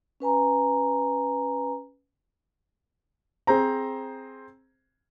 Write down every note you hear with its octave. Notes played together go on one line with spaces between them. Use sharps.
C#4 B4 G#5 A#5
C4 G#4 C5 A#5